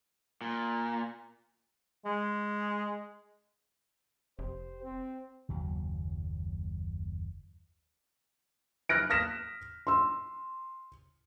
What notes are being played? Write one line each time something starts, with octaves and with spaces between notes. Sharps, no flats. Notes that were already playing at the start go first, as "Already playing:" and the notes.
A#2
G#3
F1 G4 C5
C4
F#1 D#2 F#3
F6 F#6 A#6 D7
D#6 F6 A#6 B6 E7
C6 E6